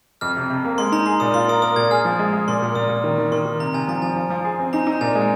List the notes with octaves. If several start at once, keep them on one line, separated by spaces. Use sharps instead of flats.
F2 F6
C3
C3
A#3
G#3 C6
D#4 A#5
G#4 C6
A#2 D#6
F4 C6
A#4 D#6
A#4 D#6
A#2 G#6
G#4 F6
F3
G#3
G#3
A#2 C6
A#2
A#2 D#6
A#2
D#3
D#3
D#3 C6
D#3
C3 A#5
C3 G#5
F3 A#5
F3 G#5
F3
F3
G#4
C4
D#4 A#5
D#4 A#5
A#2 G#5
G#3